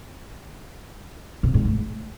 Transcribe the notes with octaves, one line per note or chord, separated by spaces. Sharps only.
C3
G#2
A3